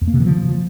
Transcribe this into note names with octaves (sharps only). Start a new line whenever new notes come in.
E2
A#3
C3
D#3
F3